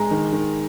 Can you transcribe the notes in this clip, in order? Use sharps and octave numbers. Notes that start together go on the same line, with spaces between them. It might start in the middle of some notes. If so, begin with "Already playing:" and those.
Already playing: G#3 A#5
D#3
D#3